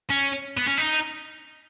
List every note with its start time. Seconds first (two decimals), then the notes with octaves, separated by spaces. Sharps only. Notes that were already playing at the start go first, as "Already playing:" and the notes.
0.10 C#4
0.57 B3
0.68 C#4
0.78 D#4